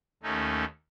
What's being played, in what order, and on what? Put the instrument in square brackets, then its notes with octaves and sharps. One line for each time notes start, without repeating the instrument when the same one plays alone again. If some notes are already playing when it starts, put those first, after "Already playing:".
[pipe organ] D#2 A3 C#4 D#4